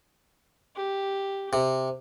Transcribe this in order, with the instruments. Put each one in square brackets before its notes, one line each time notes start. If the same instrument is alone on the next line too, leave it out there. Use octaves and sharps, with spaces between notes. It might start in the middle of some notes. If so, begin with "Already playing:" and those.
[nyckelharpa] G4
[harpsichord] C3